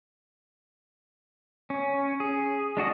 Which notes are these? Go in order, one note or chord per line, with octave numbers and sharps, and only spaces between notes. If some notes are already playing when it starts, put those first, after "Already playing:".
C#4
G#4
G#3 D4 F#4 D#5